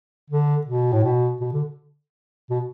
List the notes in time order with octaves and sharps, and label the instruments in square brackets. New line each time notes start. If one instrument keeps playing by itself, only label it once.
[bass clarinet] D3
B2
A2
B2
B2
D3
B2